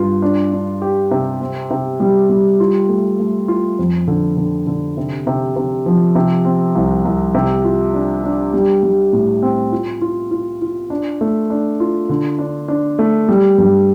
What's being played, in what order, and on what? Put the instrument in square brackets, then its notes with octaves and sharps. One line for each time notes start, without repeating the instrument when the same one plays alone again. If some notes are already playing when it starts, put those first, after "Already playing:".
Already playing: [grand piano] G2 F4
D4
D4
G4
C3
C4
C3
G3
G3
F4
A3
A3
F4
F2
D3
D3
D3
C3
C3
C3
F3
C3
C4
C2
C2
C3
F4
D4
D4
G3
G3
A2
C4
F4
F4
F4
F4
D4
A3
D4
F4
D3
D4
D4
A3
G3
G2